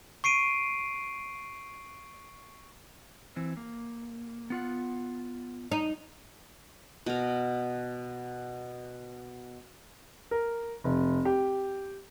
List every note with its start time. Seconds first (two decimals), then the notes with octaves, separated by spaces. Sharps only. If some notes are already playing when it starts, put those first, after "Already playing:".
0.24 C#6 C7 D7 D#7
3.36 E3 C4
3.57 A#3
4.50 B3 F4 F#5
5.72 D#4
7.06 B2 A#4
10.31 A#4
10.84 F1
11.25 G4